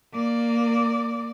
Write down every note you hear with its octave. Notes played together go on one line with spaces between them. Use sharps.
A#3 D5